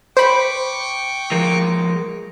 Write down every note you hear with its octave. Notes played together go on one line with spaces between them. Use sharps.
C5 G5 B5 C#6 D6
F3 G#3 A#4